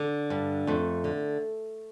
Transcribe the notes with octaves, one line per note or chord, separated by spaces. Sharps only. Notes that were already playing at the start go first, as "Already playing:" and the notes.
Already playing: D3
G2
F2 A3
D3